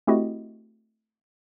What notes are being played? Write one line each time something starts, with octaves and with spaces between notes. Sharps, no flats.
A3 C4 E4 F#4 G4 D#5